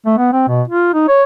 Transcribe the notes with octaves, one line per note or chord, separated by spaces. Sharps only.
A3
B3
C4
B2
F4
D#4
C#5